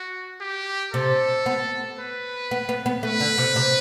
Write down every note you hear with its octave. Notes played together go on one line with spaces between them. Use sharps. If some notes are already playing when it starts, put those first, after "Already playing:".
Already playing: F#4
G4
C3 A4
B3
B4
B3
B3
B3
A3 B4
D3
C3
C3